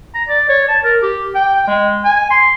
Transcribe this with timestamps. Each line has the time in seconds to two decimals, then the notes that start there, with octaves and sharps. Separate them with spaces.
0.15 A#5
0.28 D5
0.49 C#5
0.68 A5
0.84 A#4
1.02 G4
1.35 G5
1.68 G#3
2.05 G#5
2.31 C6